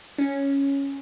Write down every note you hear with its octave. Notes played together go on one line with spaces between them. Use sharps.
C#4